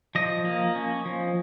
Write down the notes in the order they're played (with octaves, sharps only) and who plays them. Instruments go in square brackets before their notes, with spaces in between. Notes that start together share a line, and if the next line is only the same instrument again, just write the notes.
[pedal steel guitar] F3 D#5
A#3
C#4
F3